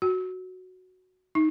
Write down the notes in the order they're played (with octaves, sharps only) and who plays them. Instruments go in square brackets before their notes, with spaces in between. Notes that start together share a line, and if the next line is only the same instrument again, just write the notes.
[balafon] F#4
D#4